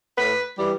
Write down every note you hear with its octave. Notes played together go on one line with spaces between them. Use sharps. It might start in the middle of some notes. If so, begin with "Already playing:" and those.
A2 B4
E3 G3